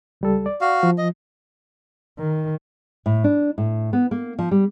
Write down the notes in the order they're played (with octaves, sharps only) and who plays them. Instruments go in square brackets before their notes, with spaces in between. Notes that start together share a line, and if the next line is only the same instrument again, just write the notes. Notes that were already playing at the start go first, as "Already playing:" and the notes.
[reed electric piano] C#2 G3 A4
D5
[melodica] F#4 F5
[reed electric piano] F3
[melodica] D#5
[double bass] D#3
[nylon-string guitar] A2
D4
A2
B3
A#3
F3
G3